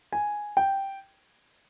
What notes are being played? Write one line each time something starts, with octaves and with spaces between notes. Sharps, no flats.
G#5
G5